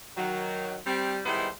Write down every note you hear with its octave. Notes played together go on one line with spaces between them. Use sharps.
D#3 F#3
G3 C4
D#3 G3 G#3 B3 E4 C5